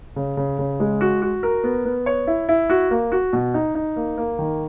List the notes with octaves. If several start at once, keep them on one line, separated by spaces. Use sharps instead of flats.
C#3
C#3
C#3
G#3
F#4
F#4
A#4
B3
B3
C#5
E4
E4
F#4
A#3
F#4
B2
D#4
D#4
A#3
A#3
D#3